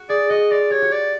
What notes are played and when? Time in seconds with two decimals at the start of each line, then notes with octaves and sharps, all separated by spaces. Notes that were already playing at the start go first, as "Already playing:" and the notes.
Already playing: F#4
0.09 G#4 D5
0.30 F#4 D#5
0.51 F4 D5
0.70 G4 C#5
0.82 F#4
0.92 D5